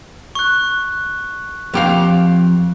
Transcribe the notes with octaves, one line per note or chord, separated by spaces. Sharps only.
C#6 F#6
F2 G4 F5